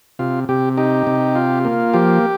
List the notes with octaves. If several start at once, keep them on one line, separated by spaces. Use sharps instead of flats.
C3 F4
C3 G4
D#4 G4
C3
F4
A#3
F3 G4